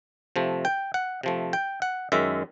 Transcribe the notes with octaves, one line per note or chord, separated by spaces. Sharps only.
C3 F3 A3
G5
F#5
C3 F3 A3
G5
F#5
F#2 D#3 G#3 E5